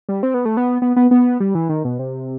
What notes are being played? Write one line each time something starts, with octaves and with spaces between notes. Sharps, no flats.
G3
C4
B3
A3
B3
B3
B3
B3
G3
E3
D#3
B2
C3